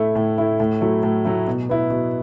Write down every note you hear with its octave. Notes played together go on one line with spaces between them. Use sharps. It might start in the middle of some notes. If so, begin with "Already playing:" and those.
Already playing: A2 A3 E4
A2
A3 E4
A2
F#3 A3 E4
A2
F#3 A3 E4
B2
B3 E4
B2